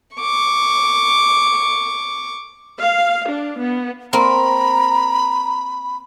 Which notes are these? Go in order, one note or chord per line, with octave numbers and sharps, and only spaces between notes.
C#6 D6
F5
D4
B3
A#3 C4 A#5 B5